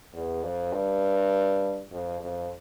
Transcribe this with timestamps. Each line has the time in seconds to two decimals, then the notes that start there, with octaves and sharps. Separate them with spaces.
0.13 E2
0.43 F2
0.72 G2
1.91 F2
2.21 F2